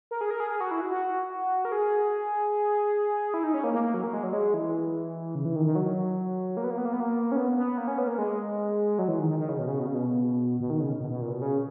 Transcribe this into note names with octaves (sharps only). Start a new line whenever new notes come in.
A#4
G#4
A#4
G#4
G#4
F#4
E4
F#4
F#4
A#4
G#4
E4
D#4
C#4
A#3
A#3
A#3
F#3
A#3
G#3
F#3
G#3
E3
C#3
E3
D#3
D#3
F#3
A#3
B3
A#3
B3
A#3
B3
A#3
C#4
B3
B3
A#3
C#4
B3
A#3
G#3
F#3
E3
D#3
D#3
D#3
C#3
B2
C#3
B2
C#3
B2
B2
D#3
C#3
B2
B2
A#2
B2
C#3